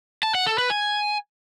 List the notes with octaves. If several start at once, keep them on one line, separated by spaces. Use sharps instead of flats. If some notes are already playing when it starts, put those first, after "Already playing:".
A5
F#5
A4
B4
G#5